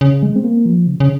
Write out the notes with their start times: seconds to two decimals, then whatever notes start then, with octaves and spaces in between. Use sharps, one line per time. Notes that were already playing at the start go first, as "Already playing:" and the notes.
0.01 C#3
0.23 G#3
0.36 C4
0.44 A#3
0.66 F3
0.87 C#3
1.00 C#3